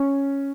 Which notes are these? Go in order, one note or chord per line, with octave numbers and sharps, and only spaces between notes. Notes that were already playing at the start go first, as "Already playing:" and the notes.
Already playing: C#4